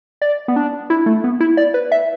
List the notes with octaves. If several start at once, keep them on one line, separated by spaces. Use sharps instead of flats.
D5
B3
D4
E4
A3
B3
E4
D5
B4
E5